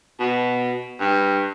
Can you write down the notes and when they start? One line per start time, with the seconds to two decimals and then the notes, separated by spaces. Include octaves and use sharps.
0.19 B2
1.00 G2